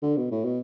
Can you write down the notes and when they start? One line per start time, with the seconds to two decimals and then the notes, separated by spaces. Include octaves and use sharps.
0.02 D3
0.17 B2
0.31 A2
0.44 B2